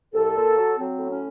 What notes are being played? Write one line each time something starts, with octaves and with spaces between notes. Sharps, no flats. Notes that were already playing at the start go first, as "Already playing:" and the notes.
C2 A4
A#2
F#3
F#3 C4
A2
C#4